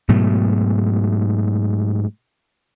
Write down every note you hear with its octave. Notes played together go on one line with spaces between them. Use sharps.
G#2 B2 F#3 A3